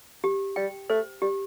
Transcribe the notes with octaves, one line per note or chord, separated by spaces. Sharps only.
G4
G3 G5
A3 C5
G3 G4